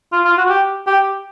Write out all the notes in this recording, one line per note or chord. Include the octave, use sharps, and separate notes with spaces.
F4
F4
F#4
G4
G4